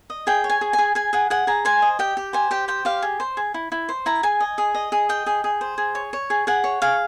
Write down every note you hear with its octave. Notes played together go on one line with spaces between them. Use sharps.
D#5
G#4 G5
C#5
G#5
G#4
G#5
G#4
G#4 G#5
G#4 F#5
G#4 F#5
G#4 A#5
C5 G#5
D#5
G4 G5
G4
C5 G#5
G4 G5
C5 G5
G4 F5
G#4
C5
G#4
E4
E4
C5
E4 A#5
G#4 G#5
D#5
G#4
D#5
G#4
D#5 G5
G#4
G#4
C5
G#4
C#5
C#5
G#4
G#4 F#5
C#5
G#4 F5